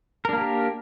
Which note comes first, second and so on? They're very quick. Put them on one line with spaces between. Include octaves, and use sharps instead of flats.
A#4 D4 A#3 G4